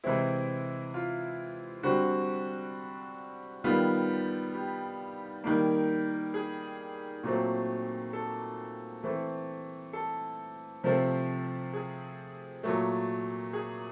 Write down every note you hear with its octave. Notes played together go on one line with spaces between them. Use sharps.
C3 E3 G#3 C4 E4
F4
D3 G3 C4 F#4
D#3 G3 B3 F4
G4
D#3 G3 A#3
G#4
A#2 F#3 A3 C4
A4
E3 A3 C4
A4
C3 F3 A3 C4
G#4
A#2 F#3 A3
G#4